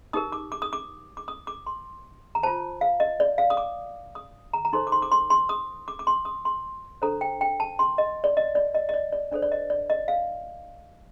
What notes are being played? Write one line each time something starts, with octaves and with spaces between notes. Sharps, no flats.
D#4 G4 A#4 D#6
D6
D6
D#6
D6
D6
D#6
D6
C6
A#5
F4 C5 A5
F5
D#5
D5
F5
D#6
D6
D#6
A#5
A#5
D#4 A4 C5 C6
D6
C6
D6
C6
C6
D#6
D6
D6
C6
D#6
C6
D4 A4 C5 A#5
G5
G5
A5
C6
D#5
D5
D#5
D5
D#5
D#5
D5
D5
D4 A4 C5 D5
D5
D#5
D5
D#5
F5